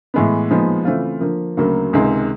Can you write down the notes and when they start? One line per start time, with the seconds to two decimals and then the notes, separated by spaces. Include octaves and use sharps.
0.14 A2 E3 G#3 B3
0.50 A#2 F3 G#3 B3 D#4
0.85 C#3 E3 A3 C4 F4
1.21 D3 F3 A#3
1.57 D2 C#3 F#3 A#3
1.93 C#2 C3 D#3 G#3